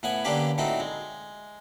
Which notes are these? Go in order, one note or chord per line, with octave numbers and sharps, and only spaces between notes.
A2 B3 F#5 G#5
D3 A#3 C#4 D4 G4 B4
A2 A3 C4 D#4 F#4
G#3